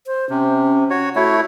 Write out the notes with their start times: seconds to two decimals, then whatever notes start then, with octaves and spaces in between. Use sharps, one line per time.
0.07 C5
0.30 C3 C#4
0.90 F#4 C#5
1.16 A3 E4 F#4 C#5